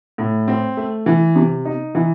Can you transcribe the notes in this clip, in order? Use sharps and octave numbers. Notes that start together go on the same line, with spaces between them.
A2
C4
A3
E3
C3
D#4
E3